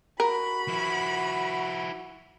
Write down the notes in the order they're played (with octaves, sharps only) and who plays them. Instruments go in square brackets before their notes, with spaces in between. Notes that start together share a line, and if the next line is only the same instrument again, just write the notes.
[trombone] F#4 [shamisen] A#4 [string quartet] B5
[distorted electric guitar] F3 E4